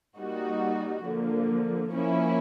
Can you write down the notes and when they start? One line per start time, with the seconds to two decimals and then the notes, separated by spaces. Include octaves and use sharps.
0.19 G3 A#3 D#4 F#4
1.04 D3 F3 A#3
1.89 F3 A#3 C#4 E4